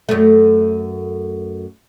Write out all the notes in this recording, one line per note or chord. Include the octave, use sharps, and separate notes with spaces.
F#2 A3